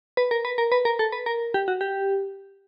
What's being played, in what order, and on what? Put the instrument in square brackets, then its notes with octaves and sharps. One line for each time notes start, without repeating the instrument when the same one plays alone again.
[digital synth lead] B4
A#4
B4
A#4
B4
A#4
A4
B4
A#4
G4
F#4
G4